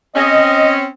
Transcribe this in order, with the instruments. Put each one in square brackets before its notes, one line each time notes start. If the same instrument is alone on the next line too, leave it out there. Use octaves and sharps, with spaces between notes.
[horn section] C4 C#4 [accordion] D#5